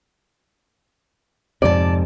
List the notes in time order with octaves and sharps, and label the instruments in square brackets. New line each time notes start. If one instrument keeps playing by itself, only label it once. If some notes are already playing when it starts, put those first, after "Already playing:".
[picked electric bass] F2 G#2 C3 [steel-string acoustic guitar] D5 A5